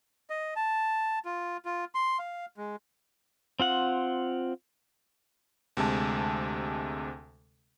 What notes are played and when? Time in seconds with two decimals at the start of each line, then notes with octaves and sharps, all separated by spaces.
0.30 D#5
0.56 A5
1.25 F4
1.65 F4
1.95 C6
2.19 F5
2.57 G#3
3.60 C4 F4 F#5
5.77 D2 C3 G#3 A5